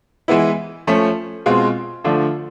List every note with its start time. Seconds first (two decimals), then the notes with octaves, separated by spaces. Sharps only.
0.28 E3 G#3 B3 E4
0.87 F3 A3 C#4
1.46 B2 G#3 C4 F4
2.04 D3 F3 A3 D4 F4